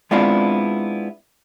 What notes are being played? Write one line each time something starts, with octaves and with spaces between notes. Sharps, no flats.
G#3 B3 C4 D4 E4 F4